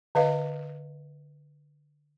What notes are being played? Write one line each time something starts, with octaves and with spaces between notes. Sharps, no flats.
D3 B4 D#5 F5